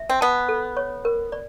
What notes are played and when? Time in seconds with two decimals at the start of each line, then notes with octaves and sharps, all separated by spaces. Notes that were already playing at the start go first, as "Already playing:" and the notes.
Already playing: E5
0.10 C4
0.21 B3 A5
0.49 A4
0.77 C#5
1.05 A#4
1.32 D5